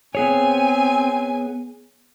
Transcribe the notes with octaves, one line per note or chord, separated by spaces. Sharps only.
B3 C4 G#4 C#5 G#5